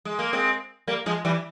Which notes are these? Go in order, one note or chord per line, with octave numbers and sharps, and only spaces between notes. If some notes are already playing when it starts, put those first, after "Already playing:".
G#3
A#3
G#3 C4
G3 A#3
F3 G#3
E3 G3